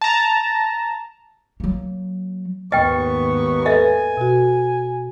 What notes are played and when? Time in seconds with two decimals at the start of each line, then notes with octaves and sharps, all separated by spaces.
0.01 A5 A#5
1.60 F#3 A#3
2.72 D#2 G#2 B3 D#5 G5 C#6 F6
3.66 A4 B4 D#5 E5 G#5
4.17 B2 F#4